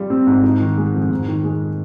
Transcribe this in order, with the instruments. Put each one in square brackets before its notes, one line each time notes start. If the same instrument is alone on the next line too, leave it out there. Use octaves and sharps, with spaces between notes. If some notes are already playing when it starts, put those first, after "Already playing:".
Already playing: [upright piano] G3 F4
C4
G#2
D#4
D#3
G#3
F2
G#2
D#3
G#3